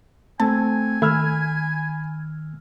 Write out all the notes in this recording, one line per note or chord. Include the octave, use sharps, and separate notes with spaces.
A3 C4 G#5 A5
D#3 A3 B5 E6 F6 G#6